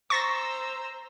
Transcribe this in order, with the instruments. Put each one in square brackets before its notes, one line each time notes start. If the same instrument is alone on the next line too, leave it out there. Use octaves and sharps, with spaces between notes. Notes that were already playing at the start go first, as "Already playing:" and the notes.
[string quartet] C5 A#5 E6 [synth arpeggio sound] C#6 A6 A#6